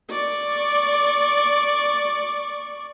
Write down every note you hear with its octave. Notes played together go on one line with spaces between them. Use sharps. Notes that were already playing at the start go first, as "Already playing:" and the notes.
D5 C#6